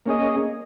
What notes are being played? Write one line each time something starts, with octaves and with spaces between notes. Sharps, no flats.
A#3 C#4 G#4 D#5